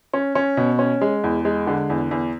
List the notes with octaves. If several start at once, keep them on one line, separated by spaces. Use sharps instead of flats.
C#4
C#4
B2
C#4
G#3
E2
G#3
D3
E2
E2